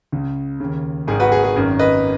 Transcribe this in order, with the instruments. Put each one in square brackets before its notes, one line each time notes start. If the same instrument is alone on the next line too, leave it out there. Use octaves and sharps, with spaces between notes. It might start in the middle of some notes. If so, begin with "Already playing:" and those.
[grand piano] C#2 C#3
D#2 C#3
G#1 G#2 D#3 G#4
F#4 B4
G#4
G#4
G#1 F#2 D#3
B4 D#5